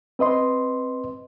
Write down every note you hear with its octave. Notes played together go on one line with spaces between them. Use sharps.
C4 B4 D#5 C6